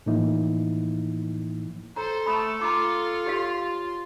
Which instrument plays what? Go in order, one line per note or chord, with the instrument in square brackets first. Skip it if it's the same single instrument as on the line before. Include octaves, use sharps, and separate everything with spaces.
[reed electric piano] A2 E3 F3 A#3 D#4 E4
[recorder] A4 [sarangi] C5 [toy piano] A#5
[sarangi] A3 [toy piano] B5 D#6
[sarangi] F4 [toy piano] A#5 D6
[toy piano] G4 C#5 F5